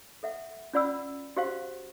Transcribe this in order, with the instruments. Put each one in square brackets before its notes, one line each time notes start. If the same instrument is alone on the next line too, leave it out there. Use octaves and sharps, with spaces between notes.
[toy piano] A4 E5 F#5
C#4 F4 D5 F#5 B5 E6
F#4 G4 C5 F5 F#5 C6